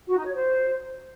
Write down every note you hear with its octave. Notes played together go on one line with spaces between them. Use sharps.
F#4
D#4
C#5
C5